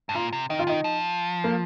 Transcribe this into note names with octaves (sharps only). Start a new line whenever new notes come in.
G2
A#2 F4
C3
D#3 D#4
F4
D#3 D#4
F3
A#3